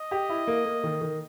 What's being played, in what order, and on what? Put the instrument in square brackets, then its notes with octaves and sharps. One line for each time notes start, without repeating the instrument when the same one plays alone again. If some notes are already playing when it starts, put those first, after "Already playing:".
Already playing: [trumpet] D#5
[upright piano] G4
E4
A#3
A#3
D#3
D#3